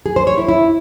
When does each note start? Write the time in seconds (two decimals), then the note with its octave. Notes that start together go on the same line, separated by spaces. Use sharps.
0.06 G#4
0.16 C5
0.27 C#5
0.38 E4
0.48 E4